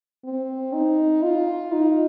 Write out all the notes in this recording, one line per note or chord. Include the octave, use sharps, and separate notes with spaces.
C4
D#4
F4
D#4